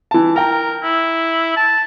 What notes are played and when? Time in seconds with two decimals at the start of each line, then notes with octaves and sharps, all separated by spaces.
0.11 E3 A5
0.36 A#4 G5 A#5
0.83 E4
1.57 A5